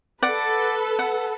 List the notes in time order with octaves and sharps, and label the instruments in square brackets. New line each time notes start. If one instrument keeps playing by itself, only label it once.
[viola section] A4 B4 [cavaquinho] D5 F#5
[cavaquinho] F#5